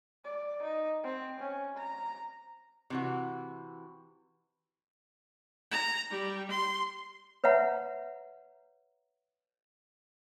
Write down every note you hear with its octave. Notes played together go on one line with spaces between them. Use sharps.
D5
D#4
C4
C#4
A#5
C3 E3 F#4
A#5
G3
C6
B4 C#5 E5 F#5 A#5